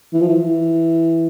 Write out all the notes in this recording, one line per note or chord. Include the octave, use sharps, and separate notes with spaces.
E3
F3
E3